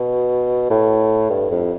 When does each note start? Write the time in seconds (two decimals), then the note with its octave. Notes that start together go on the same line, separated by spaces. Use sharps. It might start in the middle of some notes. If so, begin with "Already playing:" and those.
Already playing: B2
0.70 A2
1.30 G2
1.51 F2